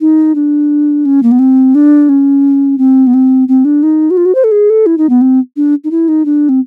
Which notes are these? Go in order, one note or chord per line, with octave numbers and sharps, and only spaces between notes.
D#4
D4
C#4
A#3
B3
C4
D4
C#4
C4
B3
C4
C4
D4
D#4
F#4
F4
F#4
C5
A4
G#4
A4
E4
D#4
B3
C4
D4
D#4
E4
D#4
D4
C4